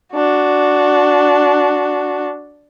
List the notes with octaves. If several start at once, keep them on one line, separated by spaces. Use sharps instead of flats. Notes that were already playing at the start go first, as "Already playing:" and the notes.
D4 F#4